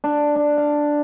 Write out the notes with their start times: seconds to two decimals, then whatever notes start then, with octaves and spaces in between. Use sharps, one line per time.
0.04 D4
0.36 D4
0.58 F5